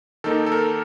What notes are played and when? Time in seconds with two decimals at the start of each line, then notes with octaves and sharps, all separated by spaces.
0.24 D#3 A#3 D#4 A4
0.46 A4
0.52 A#4